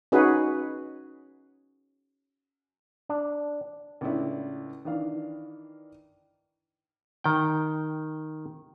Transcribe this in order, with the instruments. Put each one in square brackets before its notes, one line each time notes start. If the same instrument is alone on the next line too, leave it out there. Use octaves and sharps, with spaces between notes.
[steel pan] C#4 D#4 F#4 G#4 B4
[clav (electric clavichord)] D4
[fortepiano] C#2 A2 C#3 D4 E4
D#3 E3 D4 F5
[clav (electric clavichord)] D#3 G5